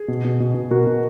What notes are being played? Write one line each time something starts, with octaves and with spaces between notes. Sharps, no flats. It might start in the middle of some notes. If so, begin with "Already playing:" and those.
Already playing: G#4
B2
B2
B2
B2
B2 F#4 A#4
B2